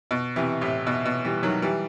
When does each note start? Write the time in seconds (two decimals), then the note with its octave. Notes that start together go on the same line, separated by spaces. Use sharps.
0.11 B2
0.36 C3 E3
0.61 A2 C3
0.87 B2
1.05 B2
1.25 E3 G3
1.43 D#3 F#3
1.62 E3 G3